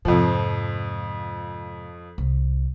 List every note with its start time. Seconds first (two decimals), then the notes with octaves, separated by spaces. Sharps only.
0.05 F2 G#2 C3 F3
2.18 C2